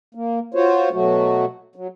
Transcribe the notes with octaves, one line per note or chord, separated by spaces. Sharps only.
A#3
F4 F#4 C5 C#5
B2 F#3 A3 F#4
F#3